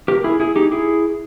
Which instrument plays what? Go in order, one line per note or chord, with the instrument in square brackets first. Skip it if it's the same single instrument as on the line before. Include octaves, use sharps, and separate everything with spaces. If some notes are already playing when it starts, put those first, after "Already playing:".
[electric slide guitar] G4 A#4
E4 G#4
E4 G#4
D#4 G4
E4 G#4